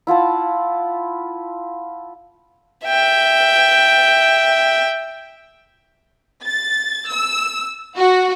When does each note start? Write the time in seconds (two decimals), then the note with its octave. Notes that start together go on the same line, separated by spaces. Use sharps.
0.07 E4 F4 F#5 A5
2.85 E5 G5
6.45 A6
7.09 E6
7.97 F#4